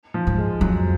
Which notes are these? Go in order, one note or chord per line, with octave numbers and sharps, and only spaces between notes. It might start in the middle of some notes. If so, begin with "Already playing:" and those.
F3
G#2
G#3
F2 F#3